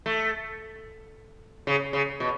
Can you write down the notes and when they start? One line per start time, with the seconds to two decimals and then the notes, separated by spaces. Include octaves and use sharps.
0.06 A3
1.67 C#3
1.93 C#3
2.20 B2